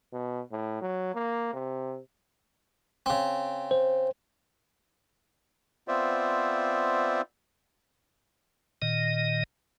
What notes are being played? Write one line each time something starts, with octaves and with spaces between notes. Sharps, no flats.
B2
A2
F#3
A#3
C3
C#3 C4
C5
B3 C4 F4 C5 D5 E5
A#2 D#3 D#5